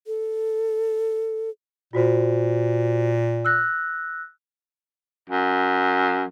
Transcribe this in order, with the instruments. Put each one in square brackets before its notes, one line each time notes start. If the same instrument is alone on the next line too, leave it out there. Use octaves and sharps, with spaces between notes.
[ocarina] A4
[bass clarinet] A#2 [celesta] F4 F#4 C5
[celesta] E6 F#6 A#6
[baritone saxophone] F#2